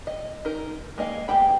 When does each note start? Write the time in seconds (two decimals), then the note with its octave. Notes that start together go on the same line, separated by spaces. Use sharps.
0.07 D#5
0.45 D#4 A#4
0.98 G#3 A#3 D#5 F5
1.28 G#3 B3 G4 G5 B5